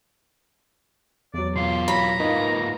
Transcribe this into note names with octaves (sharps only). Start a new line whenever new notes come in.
E2 F#3 D5
B2 F4 C6
F#3 E4 A#5 B5
G#2 A#3 D#4 F4 B4 D#5